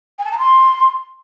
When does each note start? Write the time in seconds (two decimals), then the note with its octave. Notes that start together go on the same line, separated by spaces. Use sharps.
0.18 G#5
0.25 A5
0.32 A#5
0.38 C6